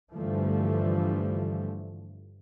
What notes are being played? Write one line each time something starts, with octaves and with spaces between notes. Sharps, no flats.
G2 D3 E3 F3 G3 A3